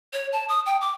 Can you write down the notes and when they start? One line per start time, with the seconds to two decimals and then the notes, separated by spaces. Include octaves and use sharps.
0.13 C#5
0.33 A5
0.49 D#6
0.66 G5
0.81 D6